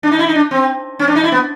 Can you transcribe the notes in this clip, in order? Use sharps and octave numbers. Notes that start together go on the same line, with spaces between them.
D4
D#4
E4
D#4
D4
C4
C#4
D4
D#4
E4
B3